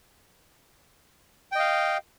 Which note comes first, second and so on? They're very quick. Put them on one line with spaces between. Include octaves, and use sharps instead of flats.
G5 D#5 F5